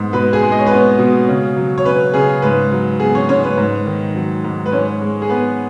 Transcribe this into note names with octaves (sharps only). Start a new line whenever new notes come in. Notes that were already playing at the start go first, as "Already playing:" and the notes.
Already playing: G#2 B3
B2 B4 B5
G#4 G#5
G#3
D#5
C#5
B4
B3 C#4 C#5
B2
C#3
F#3
C#5
C#4 B4
C#3 G#4
G#2 B4
F#3
B3 G#4
C#4 C#5
G#2 C#4 C#5
B4
G#2
D#3
F#3
G#2
B4
G#2 C#4 C#5
G#3
G#4
B3 B4